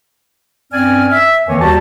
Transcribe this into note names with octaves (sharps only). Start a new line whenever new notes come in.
G2 C4 C#4 D5 G#5 F6
E5
F2 D#3 E3 A#3 C#5 G#5
D#2 G3 F#4 G4 A5